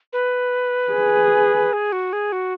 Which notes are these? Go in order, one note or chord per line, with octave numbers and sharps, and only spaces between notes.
B4
G#4
G#4
F#4
G#4
F#4